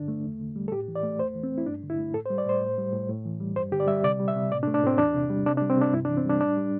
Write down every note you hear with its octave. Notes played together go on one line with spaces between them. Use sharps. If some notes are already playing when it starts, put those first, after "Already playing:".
Already playing: G2 D3 D4
A3
E2
D3
G3
A4
A2 G4
E3
D5
A3
E2 C5
E3
C4
A3
E4
G2 D4
D3
E4
A3
A2 A4
C5
G3
D5
A2 C5
A2
G3
A2
A2
E3
G3
G2 C5
D3 G4
D5
G3 E5
C3 D5
G3
E5
C3
A2 D5
D4
A3
D4
A2 C4
E2 D4
C3
G3
C3 D4
D4
G3
C4
C3 D4
G2 E4
D4
E3
C4
G3 D4
A2 D4
G3